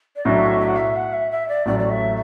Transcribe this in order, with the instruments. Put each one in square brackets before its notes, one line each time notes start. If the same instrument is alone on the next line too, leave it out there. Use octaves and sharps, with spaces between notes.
[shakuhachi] D5
[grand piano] B1 A2 F#3 D4 F#4 [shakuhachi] E5
[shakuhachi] E5
F#5
E5
F#5
E5
E5
D5
[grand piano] A1 A2 F#3 A3 [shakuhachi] D5
[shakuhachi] D5
E5